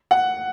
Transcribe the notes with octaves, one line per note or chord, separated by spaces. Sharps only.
F#5